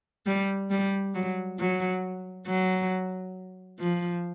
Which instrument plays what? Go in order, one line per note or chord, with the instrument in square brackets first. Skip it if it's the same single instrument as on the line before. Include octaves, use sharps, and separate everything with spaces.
[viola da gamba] G3
G3
F#3
F#3
F#3
F3